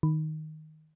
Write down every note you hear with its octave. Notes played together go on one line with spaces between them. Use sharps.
D#3